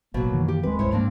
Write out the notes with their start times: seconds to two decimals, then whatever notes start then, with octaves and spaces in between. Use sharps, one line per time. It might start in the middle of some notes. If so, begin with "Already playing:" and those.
0.14 A1 B2 F#3 A#3
0.31 F#2 D#3 E3
0.48 G4
0.63 D#2 G3 G#3 C4 B4
0.79 C#2 G#2 E4 C5 C#5
0.92 G#2 F3 G#3 A#3 C4 D4